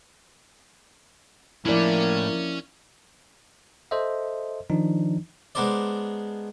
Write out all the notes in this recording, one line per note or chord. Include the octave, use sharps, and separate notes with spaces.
A2 F3 A#3 C#4 E4 D5
A4 C5 D#5 E5
D#3 F3 D4 D#4
G#3 B3 D4 A#4 C5 D5